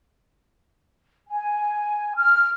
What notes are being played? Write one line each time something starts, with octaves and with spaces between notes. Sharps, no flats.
G#5
F6